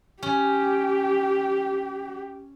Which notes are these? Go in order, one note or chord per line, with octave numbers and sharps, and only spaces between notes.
C#4 G4